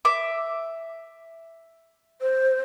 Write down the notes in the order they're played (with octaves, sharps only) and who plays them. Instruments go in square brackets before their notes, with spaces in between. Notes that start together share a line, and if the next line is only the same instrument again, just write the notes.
[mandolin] E5 D6
[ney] C5